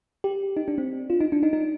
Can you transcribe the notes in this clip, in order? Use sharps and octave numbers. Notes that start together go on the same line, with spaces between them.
G4
D#4
D4
C4
F4
D#4
D4
D#4
D#4